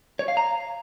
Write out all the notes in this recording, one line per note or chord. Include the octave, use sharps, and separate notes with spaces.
C#5
F5
A#5